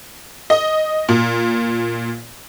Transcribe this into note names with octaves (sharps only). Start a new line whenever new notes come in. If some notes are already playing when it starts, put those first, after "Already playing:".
D#5
A#2